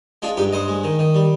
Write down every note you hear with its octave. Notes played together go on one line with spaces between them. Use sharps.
G#3 D4 F4
G2 D#4 G4
G2 C5 D#5
G#3
D#3
D#3
G3